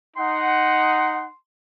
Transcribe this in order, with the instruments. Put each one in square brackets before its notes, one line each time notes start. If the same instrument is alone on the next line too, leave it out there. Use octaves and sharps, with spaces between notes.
[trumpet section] D#4 F#5 [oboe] C6